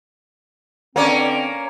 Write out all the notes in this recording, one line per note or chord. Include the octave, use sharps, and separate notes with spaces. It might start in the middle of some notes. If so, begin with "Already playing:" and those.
B2 D3 A#3 C4 C#4